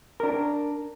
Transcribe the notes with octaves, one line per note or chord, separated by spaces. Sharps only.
D4 A#4